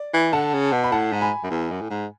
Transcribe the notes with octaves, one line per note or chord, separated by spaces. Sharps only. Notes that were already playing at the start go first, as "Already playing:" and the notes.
Already playing: D5
E3
D3 F#5 A5
C#3
B2
B5
A2 F#5 A5
G#2
G#5 B5
F#2
E2
F#2
A2
G#2